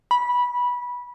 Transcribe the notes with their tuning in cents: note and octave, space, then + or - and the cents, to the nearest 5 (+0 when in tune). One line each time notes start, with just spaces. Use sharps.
B5 -15